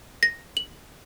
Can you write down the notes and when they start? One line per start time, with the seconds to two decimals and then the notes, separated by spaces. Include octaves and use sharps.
0.23 A#6
0.57 F#7